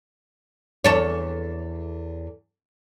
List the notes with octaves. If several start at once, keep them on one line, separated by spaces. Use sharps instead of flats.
E2 A4 C#5